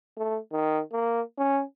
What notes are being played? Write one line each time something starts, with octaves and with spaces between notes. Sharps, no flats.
A3
D#3
A#3
C#4